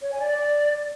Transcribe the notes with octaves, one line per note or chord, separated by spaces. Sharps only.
C#5
G#5
D5